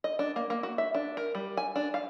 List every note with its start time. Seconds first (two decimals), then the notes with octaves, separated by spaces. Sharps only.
0.04 D#5
0.19 D4
0.36 A#3
0.50 A#3
0.63 F#4
0.78 E5
0.95 D4
1.17 A#4
1.35 G3
1.57 G#5
1.76 D4
1.94 F5